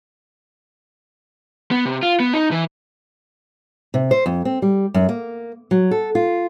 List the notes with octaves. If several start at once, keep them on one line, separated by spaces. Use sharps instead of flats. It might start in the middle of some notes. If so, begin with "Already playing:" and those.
B3
C3
F4
B3
D#4
E3
C3
C5
F2
C4
G3
F#2
A#3
F#3
A4
F4